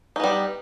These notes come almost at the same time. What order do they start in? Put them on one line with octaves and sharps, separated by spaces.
D#4 B3 G3